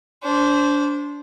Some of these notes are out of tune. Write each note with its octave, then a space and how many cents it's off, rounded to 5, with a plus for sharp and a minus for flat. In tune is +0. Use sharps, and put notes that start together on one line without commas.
D4 -25 C5 +0